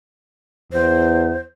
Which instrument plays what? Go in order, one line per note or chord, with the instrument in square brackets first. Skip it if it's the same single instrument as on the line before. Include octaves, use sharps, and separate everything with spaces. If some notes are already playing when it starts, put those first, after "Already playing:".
[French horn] E2 [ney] C5